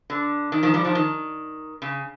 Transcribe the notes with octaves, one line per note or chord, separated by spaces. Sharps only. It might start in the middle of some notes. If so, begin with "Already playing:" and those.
D3
D#3
D#3 F3
F3 G3
D#3 F3
D#3
C#3